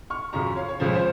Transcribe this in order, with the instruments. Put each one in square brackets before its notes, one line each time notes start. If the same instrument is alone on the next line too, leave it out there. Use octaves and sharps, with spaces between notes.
[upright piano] C#6 F6
F#2 C#3 F3 A#5 C#6
C#5 F5
C#5
C#2 C#3 F3 C5
C5